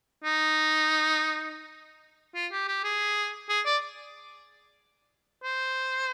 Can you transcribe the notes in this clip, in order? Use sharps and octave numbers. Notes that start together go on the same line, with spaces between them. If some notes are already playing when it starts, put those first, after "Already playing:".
D#4
F4
G4
G4
G#4
G#4
D5
C5